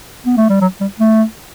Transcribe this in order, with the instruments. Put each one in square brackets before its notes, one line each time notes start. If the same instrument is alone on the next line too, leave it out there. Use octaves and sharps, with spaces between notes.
[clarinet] B3
A3
G3
F#3
G3
A3